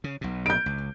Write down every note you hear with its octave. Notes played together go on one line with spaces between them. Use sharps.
C#3
B1 B2
G6 D7
C#2